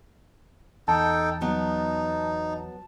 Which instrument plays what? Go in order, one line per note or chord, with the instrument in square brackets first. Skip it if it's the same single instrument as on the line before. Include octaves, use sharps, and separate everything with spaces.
[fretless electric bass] E2 [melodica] D#4 A4 G5 [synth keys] A5
[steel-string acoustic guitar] F#3 B3 [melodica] D#4